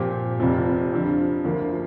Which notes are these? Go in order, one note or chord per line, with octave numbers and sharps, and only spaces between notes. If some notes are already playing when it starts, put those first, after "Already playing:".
Already playing: A#2 F3 C4 G4
F1 F2 C3 F3
F2 D3 F3
D2 D3 F3 A#3